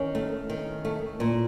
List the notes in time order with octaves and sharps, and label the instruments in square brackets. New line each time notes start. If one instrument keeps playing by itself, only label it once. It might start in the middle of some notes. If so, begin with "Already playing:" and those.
Already playing: [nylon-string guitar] D#3 [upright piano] C#4
[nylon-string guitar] A3
D#3
A3
A#2